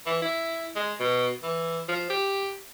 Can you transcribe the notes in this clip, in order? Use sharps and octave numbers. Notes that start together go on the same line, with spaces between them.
E3
E4
G#3
B2
E3
F3
G4